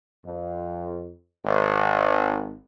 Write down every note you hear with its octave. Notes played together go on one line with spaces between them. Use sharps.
F2
G#1